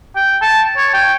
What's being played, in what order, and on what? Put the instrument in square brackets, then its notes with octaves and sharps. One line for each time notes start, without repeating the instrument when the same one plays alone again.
[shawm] G5
A5
C#5
G5